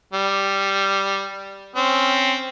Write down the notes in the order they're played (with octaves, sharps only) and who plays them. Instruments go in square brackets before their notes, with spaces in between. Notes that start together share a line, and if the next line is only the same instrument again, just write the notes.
[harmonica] G3
C4 C#4